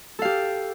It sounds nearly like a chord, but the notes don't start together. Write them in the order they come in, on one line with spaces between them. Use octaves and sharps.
A4 F5 G4